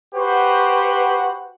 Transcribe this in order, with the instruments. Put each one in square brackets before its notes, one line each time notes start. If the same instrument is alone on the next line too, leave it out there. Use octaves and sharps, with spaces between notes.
[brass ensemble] F#4 G4 B4 C5 F#5